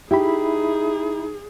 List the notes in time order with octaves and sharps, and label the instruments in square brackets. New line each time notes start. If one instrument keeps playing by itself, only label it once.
[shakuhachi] D#4 [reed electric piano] E4 E5 B5 [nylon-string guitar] G4 [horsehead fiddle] G#4